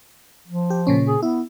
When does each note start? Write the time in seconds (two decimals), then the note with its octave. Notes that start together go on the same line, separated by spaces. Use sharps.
0.48 F3
0.70 G4
0.87 A#2 C#3 C#4
1.07 G#4
1.22 B3 E4